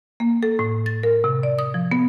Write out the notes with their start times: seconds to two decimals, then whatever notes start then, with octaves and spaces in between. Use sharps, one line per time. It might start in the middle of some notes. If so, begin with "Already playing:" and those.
0.20 A#3
0.43 A4
0.59 A2
0.86 A6
1.03 A#4
1.24 C3
1.43 D5
1.59 D#6
1.74 F3
1.91 B3